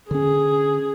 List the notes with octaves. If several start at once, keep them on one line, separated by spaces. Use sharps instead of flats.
D3 C#4 G#4